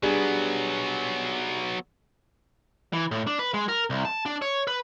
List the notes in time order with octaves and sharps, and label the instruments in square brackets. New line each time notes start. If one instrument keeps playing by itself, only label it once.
[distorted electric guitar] F#3 B3 [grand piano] G3 D4 G#4
[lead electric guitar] E3
A2
D4
B4
G#3
A#4
C2
A5
D4
C#5
B4